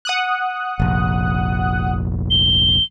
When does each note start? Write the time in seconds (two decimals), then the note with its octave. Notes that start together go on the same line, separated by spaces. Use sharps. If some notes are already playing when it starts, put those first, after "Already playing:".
0.05 F#5 D#6 F#6
0.80 F1 A#1
2.31 G7